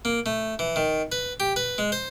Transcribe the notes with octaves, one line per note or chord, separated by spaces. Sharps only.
A#3
A3
E3
D#3
B4
G4
B4
G#3
C5